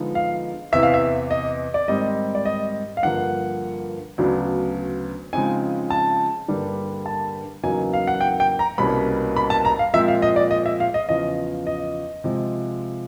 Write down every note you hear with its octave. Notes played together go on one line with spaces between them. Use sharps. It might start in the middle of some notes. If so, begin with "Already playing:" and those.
Already playing: D3 F3 G#3 B3 D#4
F5
E2 C3 E3 E5
F5
E5
D#5
D5
G#2 D#3 G3 C4 D#5
D5
D#5
F5
G2 D3 F3 A#3 F#5
D2 C#3 F#3 B3 D4
C#3 F3 G#3 C4 D#4 G#5
A5
G2 D3 G3 A#3 D4
A5
E2 C#3 F#3 A#3 D#4 G#5
F5
F#5
G5
G5
A#5
C2 B2 G3 A#3 C#4 B5
B5
A5
A#5
F5
A#2 F3 G#3 C4 E5
F5
D#5
D5
D#5
E5
F5
D#5
E2 C#3 F3 D#5
D#5
C3 F3 G#3